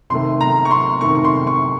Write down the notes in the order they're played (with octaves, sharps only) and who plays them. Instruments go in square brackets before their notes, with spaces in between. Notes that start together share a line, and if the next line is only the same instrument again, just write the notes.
[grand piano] C3 D#3 A3 [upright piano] C6
[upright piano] A#5
C#6
C6
[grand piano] C3 D#3 A3 [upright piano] C#6
[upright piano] C#6
C6
C#6